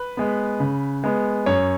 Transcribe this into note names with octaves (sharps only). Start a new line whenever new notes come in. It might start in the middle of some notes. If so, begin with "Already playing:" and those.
Already playing: B4
G#3 B3
C#3
G#3 B3
F#2 C#5